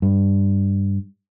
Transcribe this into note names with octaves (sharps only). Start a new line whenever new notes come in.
G2